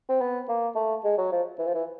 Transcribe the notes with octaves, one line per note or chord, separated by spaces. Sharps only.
C4
B3
A#3
A3
G#3
F#3
F3
E3
F3
E3